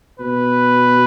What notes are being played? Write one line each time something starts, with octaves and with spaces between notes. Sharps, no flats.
B2 B4